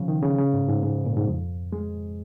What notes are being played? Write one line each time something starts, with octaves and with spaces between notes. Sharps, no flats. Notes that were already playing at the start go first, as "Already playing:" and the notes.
Already playing: C#3 F3
D#3
C#3
C#3
G#2
G#2
G#2
A#2
G#2
F2
G#3